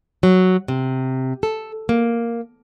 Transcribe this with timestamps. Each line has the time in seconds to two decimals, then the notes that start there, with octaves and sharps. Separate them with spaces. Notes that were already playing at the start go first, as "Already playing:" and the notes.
0.23 F#3
0.68 C3
1.43 A4
1.89 A#3